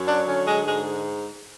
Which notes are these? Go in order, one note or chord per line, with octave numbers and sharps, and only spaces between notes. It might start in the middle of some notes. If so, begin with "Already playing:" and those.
Already playing: F#2 F#3
D4
D3 C#4
G#3
G#2 G#3